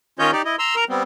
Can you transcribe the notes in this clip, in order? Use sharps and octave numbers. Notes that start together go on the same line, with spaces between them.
D#3 C#4 F4 C#5 D#5 G6
D#4 G4 D5
E4 D#5
A#5 C6 E6
A#4 A#5
G3 B3 C4